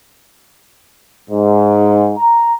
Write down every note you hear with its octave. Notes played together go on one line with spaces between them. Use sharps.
G#2
A#5